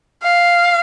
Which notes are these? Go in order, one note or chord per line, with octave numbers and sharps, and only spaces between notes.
F5